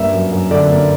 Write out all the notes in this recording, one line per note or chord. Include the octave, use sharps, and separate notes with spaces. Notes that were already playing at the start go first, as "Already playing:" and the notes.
Already playing: G2 A#3 E5
F#2
F#2
D3 D5
A#3